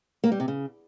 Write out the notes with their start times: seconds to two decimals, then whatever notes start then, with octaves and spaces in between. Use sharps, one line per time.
0.24 A#3
0.32 G3
0.40 C3
0.48 C#3